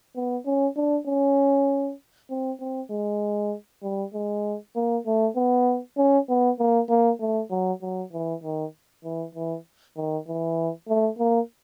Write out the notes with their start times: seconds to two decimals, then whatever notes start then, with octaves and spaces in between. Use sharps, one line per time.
0.16 B3
0.46 C#4
0.77 D4
1.07 C#4
2.30 C4
2.60 C4
2.91 G#3
3.83 G3
4.14 G#3
4.76 A#3
5.06 A3
5.36 B3
5.97 C#4
6.29 B3
6.59 A#3
6.89 A#3
7.20 A3
7.51 F#3
7.82 F#3
8.13 E3
8.44 D#3
9.04 E3
9.35 E3
9.96 D#3
10.27 E3
10.88 A3
11.19 A#3